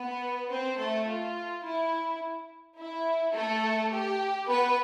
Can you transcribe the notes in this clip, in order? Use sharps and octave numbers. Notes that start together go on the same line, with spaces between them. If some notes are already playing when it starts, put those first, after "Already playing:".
Already playing: B3 B4
C4 C5
A3 A4
F4
E4
E4
A3 A4
G4
B3 B4